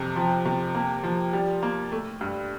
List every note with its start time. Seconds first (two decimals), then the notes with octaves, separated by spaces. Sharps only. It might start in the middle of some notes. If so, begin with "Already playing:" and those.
Already playing: F2 C3
0.16 F3
0.45 C3
0.75 A#3
1.03 F3
1.33 G3
1.63 A#3
1.92 A3
2.21 G2